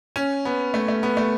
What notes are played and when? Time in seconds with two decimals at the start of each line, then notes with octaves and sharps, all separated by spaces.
0.16 C#4
0.45 B3
0.74 A3
0.88 A3
1.03 B3
1.17 A3